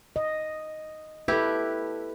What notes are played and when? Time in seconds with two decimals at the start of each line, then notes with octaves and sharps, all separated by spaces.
0.16 D#5
1.28 E4 G4 A4 B4